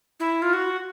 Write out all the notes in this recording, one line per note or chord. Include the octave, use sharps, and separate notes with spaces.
E4
F4
F#4